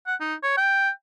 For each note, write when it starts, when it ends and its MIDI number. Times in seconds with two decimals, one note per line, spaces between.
0.07 0.15 78
0.20 0.35 63
0.43 0.55 73
0.57 0.90 79